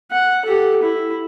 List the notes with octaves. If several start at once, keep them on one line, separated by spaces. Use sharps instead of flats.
F#5
G4 A4
E4